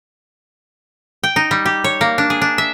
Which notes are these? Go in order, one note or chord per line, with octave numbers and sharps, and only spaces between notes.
G5
D#4
G3
G4
C#5
A#3
D4
G#4
D4
E5